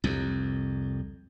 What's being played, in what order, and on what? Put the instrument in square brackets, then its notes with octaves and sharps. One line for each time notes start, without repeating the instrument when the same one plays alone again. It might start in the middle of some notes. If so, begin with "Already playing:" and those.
[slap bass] C2 F2